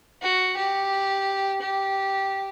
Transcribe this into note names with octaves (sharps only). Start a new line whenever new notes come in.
F#4
G4
G4